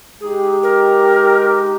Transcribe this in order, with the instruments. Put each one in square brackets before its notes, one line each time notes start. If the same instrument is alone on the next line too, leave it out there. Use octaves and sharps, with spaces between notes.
[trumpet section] G#3 D#4 G4 [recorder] G#4
[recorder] A#4